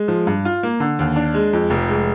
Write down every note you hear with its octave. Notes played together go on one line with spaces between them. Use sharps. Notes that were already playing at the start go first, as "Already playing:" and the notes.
Already playing: G#3
F3
G2
F4
A#3
D3
D#2
D4
G#3
F2
F1
G#3